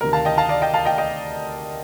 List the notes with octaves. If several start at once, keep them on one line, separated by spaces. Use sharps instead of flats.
D2 C3 D#3 A#4
F5 A5
D#5 G5
F5 A5
D5 F5
D#5 G5
F5 A5
D#5 G5
D#5 G5